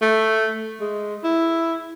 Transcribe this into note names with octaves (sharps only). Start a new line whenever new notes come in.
A3
G#3
E4